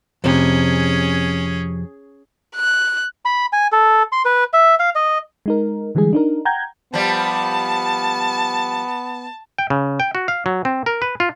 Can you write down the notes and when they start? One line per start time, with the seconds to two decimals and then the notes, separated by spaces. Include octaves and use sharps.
0.24 F2 C3 C#4 G#4
2.56 F#6
3.25 B5
3.53 G#5
3.72 A4
4.12 C6
4.25 B4
4.53 E5
4.80 F5
4.95 D#5
5.46 G#3 D#4 A#4
5.95 D3 E3 G3 G#3 G#4
6.13 D4 D#4 A#4
6.45 F#5 G5 A#5 G6 G#6
6.94 F3 G3 B3 A5
9.58 G5
9.70 C#3
10.00 G5
10.15 F#4
10.28 F5
10.46 F#3
10.65 C4
10.86 A#4
11.02 B4
11.20 F4